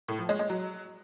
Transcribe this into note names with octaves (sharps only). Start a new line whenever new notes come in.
A2
F3
G#3
G#3
F#3